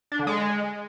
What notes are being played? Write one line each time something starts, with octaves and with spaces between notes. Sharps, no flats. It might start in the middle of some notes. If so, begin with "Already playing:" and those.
D4
D3
G#3